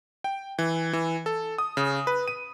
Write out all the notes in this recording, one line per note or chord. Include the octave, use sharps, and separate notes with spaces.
G5
E3
E3
A4
D#6
C#3
B4
D#7